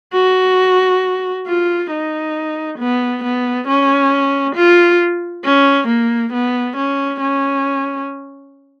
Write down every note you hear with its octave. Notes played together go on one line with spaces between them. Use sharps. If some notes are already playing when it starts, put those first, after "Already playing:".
F#4
F4
D#4
B3
B3
C#4
F4
C#4
A#3
B3
C#4
C#4